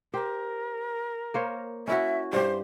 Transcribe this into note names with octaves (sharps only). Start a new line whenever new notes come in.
G4 A#4 C5
A#3 C5 C#5
C#4 E4 F#4 E5
G2 G4 C5